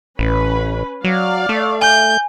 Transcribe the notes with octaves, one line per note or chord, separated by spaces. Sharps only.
A1 C#4 B4 B5
F#3 D5 F5
A3
G#5 G6